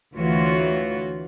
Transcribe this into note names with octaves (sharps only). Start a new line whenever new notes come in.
D2 E3 F4 F#4 C#5